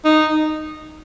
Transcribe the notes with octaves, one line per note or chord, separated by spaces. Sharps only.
D#4